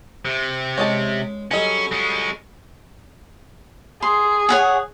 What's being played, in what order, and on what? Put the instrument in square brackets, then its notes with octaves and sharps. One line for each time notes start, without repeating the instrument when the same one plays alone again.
[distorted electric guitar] C3
[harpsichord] G#3 [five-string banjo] C#4 D#5 A5
[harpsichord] F#3 G3 A4 [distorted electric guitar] C#4 [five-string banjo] G#4 D#5
[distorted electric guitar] G#3 C#4
[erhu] G#4 [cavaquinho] C6
[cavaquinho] C#5 F#5 G#5